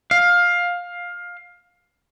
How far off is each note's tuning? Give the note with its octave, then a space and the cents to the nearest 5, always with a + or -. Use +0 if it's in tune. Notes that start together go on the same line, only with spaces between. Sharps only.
F5 +15